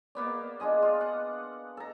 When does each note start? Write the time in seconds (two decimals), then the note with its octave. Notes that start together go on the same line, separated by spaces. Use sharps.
0.15 A#3 B3 D5
0.60 D4 F4 G#4 D#5
0.82 F4
1.01 F#5
1.77 A4 A#5